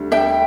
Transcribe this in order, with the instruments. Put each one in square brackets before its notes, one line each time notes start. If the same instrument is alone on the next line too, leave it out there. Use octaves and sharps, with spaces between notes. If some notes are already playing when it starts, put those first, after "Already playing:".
Already playing: [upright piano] D2 D3 G3
[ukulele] E5 G5